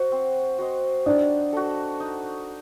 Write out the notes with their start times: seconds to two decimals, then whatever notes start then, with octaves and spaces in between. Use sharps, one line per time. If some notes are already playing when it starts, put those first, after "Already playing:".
Already playing: F#4 C5
0.12 C4
0.59 F#4 C5 D#5
1.06 D4 D#4
1.53 F#4 A4
2.00 D#4